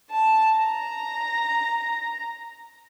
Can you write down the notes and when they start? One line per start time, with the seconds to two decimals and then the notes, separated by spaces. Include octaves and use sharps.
0.10 A5
0.57 A#5